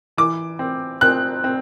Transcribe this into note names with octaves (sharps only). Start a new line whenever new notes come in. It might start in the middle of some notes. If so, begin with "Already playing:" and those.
E3 D6
C4
C4 F#6
C4